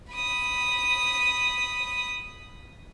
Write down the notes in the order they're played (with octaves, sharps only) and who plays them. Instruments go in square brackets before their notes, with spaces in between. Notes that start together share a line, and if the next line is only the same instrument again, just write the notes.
[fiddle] B5 D#6